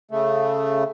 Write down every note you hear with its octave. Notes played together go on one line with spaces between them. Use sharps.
C#3 A3